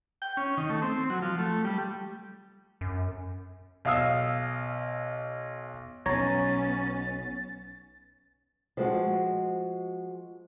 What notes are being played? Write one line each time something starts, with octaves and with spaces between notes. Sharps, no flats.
G5
C#4
D#3
A3
C4
F#3
F3
A3
G3
F#2
B1 F5 D#6 E6
B1 B2 B3 C#4 C#5 A#5 A6
F3 G#3 F#4